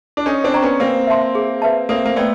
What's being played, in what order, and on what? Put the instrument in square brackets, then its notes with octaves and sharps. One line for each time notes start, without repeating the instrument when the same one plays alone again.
[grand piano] D4
[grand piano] C#4 D#4 [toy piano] A4
[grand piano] C4 D4
[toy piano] D5 G5 A#5 C#6
[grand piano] B3 C#4
[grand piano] A#3 C4 [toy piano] B4
[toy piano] E5 A5 C6
G#4
B4 E5 A5
[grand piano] A#3 C4 [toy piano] A4
[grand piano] A#3
[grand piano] A3 B3 [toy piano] D5 G5